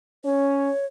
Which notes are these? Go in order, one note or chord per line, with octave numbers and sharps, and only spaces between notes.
C#4 C#5